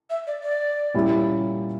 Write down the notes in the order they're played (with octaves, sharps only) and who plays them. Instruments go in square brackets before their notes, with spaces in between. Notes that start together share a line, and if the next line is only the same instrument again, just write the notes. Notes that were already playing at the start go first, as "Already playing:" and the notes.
[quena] E5
D5
D5
[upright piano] A#2 G3 C#4 E4 G4